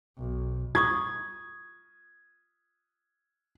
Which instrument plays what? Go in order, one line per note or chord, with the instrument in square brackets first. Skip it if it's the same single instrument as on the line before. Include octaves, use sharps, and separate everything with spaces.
[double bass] B1
[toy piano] F4 C#6 D#6 [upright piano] G#6